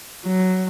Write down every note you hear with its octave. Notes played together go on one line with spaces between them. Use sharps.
F#3